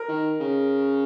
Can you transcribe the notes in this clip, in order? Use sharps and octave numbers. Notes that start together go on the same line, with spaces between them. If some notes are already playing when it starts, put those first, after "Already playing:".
Already playing: A#4
D#3
C#3